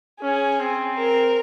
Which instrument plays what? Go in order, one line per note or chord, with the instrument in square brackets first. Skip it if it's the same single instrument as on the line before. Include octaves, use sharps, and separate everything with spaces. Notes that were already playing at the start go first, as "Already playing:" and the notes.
[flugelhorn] C#4 [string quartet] G#4
[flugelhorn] C4
[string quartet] A#4